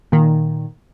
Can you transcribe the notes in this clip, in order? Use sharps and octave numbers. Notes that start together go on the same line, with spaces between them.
A#2 D#3